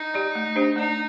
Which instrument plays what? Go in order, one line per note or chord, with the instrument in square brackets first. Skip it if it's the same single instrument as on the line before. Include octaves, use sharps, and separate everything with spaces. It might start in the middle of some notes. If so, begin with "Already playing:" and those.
Already playing: [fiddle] D#4
[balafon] G4 D5
A3
D4 G4 C5
[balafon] A3 [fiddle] D#4